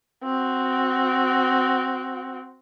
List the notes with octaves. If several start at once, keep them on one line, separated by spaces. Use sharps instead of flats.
C4 F#4